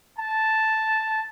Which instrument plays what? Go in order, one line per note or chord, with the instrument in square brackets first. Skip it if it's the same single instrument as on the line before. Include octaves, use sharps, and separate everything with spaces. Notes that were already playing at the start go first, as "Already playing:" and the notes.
[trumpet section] A5